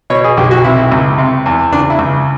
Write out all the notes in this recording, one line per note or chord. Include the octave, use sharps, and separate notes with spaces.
B2 C#5
G#4
B1 G4
F#4
C3 E4
C#2
C3
E2
C#3 D4
E4
C#2